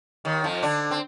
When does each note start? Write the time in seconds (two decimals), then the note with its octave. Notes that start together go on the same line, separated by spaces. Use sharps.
0.25 D#2 D#3
0.44 F2 F3
0.63 D3 D4
0.91 C4